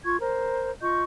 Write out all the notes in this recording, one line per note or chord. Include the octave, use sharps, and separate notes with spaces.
F4 C#6 G#6
A#4 C5
F4 D#5 C#6 G6